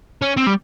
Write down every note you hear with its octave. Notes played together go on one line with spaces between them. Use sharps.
C#4
C4
G3